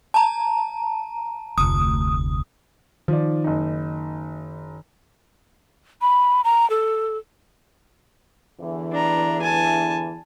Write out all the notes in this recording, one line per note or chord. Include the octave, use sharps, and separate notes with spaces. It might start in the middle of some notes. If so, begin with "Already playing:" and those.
A5 A#5
F1 D2 D#6
D#3 F3 D5
F#1 D#4
B5
A#5
A4
E2 D3 E3
D4 A#5
G#5 A5